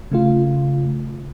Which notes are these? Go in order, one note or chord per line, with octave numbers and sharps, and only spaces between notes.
C#3 A3 F4